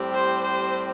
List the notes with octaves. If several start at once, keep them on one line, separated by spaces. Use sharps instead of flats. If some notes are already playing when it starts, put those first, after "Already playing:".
Already playing: A2 G3 C4 G4
C5
C5